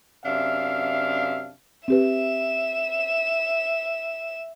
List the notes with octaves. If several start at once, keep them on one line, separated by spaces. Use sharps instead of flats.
F#2 C3 D4 E5 F5
C4 G4 B4 E5 E7